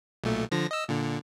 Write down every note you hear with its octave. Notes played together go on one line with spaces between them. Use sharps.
B1 A#2 A3
D3 F3 A#6
D#5 E6
A#2 D3